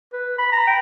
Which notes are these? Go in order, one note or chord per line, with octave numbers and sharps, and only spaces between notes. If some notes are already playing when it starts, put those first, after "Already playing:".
B4
B5
A#5
G5